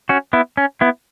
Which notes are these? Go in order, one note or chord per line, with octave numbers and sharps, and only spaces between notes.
C#4 F#4
B3 E4
C#4
B3 E4